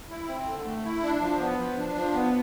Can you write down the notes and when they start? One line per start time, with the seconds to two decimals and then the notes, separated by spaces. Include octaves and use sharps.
0.10 E4
0.28 C4
0.46 D3
0.65 A3
0.84 E4
1.03 D4
1.21 F3
1.39 B3
1.58 F3
1.77 D4
1.96 F3
2.15 B3